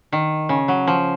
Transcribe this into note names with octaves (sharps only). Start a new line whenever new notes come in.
D#3
C#3
F#3
F3